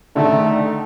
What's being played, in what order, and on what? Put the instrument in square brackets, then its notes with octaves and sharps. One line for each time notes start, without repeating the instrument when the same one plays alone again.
[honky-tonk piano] D3 D#3 [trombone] A3